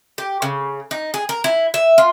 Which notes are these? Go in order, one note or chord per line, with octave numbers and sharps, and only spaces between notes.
G4
C#3
D#4
G#4
A#4
E4
E5
F4